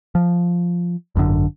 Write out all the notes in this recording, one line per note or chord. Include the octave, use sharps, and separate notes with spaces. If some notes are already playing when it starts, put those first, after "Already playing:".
F3
G#1 F#2 B2 D3